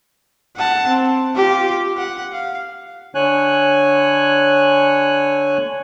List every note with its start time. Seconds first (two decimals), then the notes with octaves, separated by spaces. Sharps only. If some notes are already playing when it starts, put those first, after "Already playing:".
0.57 F#5 A5
0.88 C4
1.36 F4 G4
1.97 F#5
2.33 F5
3.15 D3 C#5 G#5 F#6